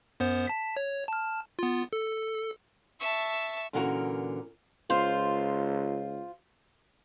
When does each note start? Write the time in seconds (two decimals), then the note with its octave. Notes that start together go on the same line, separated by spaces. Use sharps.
0.20 F#2 B3 C5
0.47 A5 B6
0.77 C#5
1.08 A5 F6
1.59 B3 F4
1.93 A4
3.00 E5 A5 C#6 E6
3.73 A#2 D3 E3 C#4 F#4 A#4
4.90 C#2 F4 C5